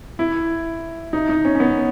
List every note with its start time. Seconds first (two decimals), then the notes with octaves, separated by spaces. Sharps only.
0.19 E4
1.13 D#4
1.29 D#4
1.45 C#4
1.55 C#4
1.60 B3